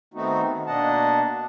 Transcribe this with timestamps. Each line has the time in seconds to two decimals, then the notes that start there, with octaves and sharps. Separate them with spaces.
0.14 D#3 A3 B3 C4 D#4 F#4
0.42 D#3
0.66 B2 A#3 D4 D#5 F#5 A5